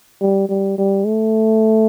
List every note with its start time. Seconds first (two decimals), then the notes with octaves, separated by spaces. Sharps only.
0.21 G3
0.49 G3
0.78 G3
1.06 A3